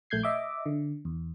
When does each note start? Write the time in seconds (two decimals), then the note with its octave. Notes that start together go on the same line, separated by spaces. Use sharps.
0.10 A#1 A3 G6 G#6 C7
0.23 D#5 E5 D6
0.66 D3
1.05 E2